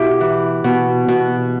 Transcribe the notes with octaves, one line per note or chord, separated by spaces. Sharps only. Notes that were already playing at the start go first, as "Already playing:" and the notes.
Already playing: B2 E4 G4
E3
B2
B2